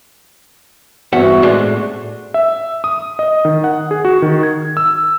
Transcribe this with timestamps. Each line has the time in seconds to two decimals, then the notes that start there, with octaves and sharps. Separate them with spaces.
1.13 E2 G2 B3 C4 F#4 E5 F#5
1.42 A2 G#3 A3 D4
2.34 E5
2.84 D#6
3.19 D#5
3.45 D#3
3.64 F#5
3.91 G#4
4.05 F#4
4.22 D#3
4.43 G#6
4.77 E6